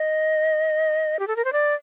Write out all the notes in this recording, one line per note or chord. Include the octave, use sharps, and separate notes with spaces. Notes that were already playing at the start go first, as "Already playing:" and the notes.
Already playing: D#5
G4
A4
A#4
C5
D5